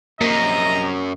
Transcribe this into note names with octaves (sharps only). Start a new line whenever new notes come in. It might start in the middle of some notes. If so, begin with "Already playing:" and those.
A#1 F#2 C3 A#3 D#5 A#5